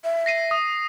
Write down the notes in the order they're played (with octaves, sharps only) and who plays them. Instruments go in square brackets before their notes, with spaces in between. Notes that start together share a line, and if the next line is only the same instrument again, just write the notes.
[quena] E5
[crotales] A#6 C7 D#7
D#6